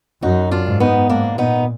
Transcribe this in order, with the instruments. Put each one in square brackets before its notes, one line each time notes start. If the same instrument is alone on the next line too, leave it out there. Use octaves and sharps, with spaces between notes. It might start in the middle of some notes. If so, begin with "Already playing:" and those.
[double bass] F#2 [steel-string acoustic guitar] D#4 F#4
[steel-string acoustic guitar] D4 F4
[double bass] G#2
[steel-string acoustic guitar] B3 D#4
[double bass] G#2 [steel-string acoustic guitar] A#3 D4
[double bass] A#2 [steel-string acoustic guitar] B3 D#4